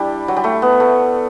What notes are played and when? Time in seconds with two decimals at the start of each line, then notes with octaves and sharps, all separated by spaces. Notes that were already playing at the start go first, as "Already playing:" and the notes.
Already playing: G3 D4 E4
0.28 F#3
0.36 G3
0.44 A3
0.62 B3
0.80 A3